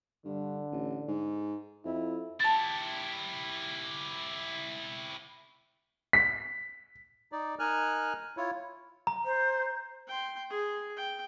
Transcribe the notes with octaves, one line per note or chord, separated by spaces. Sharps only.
G2 D3
A1
G#2
F2 E4
E4 G4 A5 A6
B6
D#4 D5
D#4 A#4 G#5 F6 F#6
E4 F4 C#5
A#5
C5
G5 C6
G#4
G5